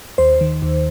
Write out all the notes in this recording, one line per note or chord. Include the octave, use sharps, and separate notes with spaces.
D#2 C5
D#3
D#2